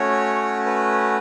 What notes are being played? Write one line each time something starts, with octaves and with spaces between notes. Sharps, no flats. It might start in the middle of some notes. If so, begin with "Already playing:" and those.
Already playing: A3 C#4 F#4 C#5
B4